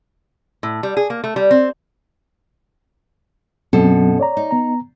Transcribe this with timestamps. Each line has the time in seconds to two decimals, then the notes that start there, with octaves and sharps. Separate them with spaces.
0.63 A2
0.83 G3
0.97 G#4
1.10 A#3
1.24 A3
1.36 G3
1.51 C4
3.73 F#2 B2 F#3 C4 A4
4.19 C#5 D5 A#5
4.37 D#4
4.51 B3 A#5